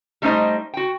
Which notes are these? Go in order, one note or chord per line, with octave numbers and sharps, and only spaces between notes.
G3 A3 C#4 D#4 C5 D#5
F#4 G5